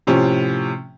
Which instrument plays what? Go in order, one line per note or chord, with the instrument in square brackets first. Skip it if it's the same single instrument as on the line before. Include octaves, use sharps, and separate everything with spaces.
[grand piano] A2 C3 F3 C#4